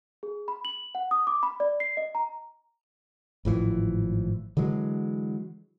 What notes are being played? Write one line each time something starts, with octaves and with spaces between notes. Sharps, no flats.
G#4
B5
F#7
F#5
D#6
D6
B5
D5
C7
D#5
A#5
G#1 A2 E3 F3
D3 E3 F#3 G#3